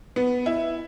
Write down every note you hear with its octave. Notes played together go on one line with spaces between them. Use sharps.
B3
E4